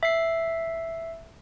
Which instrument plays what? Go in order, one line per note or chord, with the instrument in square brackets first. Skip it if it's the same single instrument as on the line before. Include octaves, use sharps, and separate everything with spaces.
[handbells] E5 C7